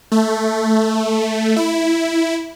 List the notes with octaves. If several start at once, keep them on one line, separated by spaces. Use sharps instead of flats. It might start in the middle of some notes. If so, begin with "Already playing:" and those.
A3
E4